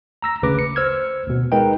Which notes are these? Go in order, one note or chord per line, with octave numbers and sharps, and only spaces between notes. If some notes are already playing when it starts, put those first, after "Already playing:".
A#5 E6 A#6
G1 D2 C#3 B4 D6 A#6
C#7
C5 E6 F6 G#6
D2 B2
G#3 D#4 A#4 B4 D#5 G5